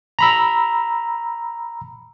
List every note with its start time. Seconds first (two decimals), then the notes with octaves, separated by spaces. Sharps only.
0.19 A#5 B5 E6